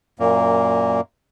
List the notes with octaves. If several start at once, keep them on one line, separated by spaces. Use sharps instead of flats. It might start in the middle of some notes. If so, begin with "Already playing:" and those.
F#2 A#2 A#3